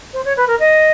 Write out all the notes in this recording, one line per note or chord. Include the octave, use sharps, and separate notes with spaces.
C5
C#5
B4
A#4
D#5